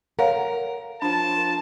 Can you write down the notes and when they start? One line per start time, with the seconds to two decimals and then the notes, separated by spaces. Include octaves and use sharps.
0.19 A#4 C#5 F5 F#5
1.02 F3 D4 F4 A5